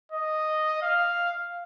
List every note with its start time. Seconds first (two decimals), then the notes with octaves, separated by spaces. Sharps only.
0.12 D#5
0.82 F5